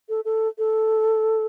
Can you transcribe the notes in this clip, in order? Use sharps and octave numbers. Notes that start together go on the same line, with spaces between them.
A4
A4
A4